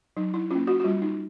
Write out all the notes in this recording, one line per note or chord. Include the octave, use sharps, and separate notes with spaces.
F#3 D#4
E4
A#3 C#4 F4
F#4
F#4
G3 F4
D#4